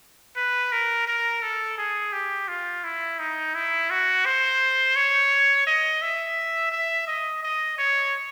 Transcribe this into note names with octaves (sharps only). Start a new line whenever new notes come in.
B4
A#4
A#4
A4
G#4
G4
F4
E4
D#4
E4
F#4
C5
C#5
D#5
E5
E5
D#5
D#5
C#5